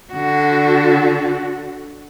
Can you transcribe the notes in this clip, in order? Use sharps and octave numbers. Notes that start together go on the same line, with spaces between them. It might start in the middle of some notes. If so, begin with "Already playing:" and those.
D3 F#4